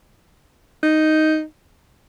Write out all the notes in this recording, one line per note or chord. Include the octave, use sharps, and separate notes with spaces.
D#4